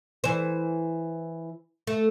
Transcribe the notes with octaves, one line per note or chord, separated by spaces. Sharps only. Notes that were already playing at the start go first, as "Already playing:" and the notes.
E3 C5
A3